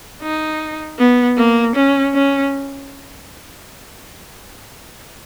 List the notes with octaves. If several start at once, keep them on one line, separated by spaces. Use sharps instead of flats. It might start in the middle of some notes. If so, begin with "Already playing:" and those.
D#4
B3
A#3
C#4
C#4